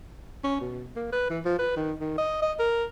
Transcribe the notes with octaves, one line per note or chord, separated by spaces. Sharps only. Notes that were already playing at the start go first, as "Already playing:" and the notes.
C#4
B2
A#3
B4
E3
F3
B4
D#3
D#3
D#5
D#5
A#4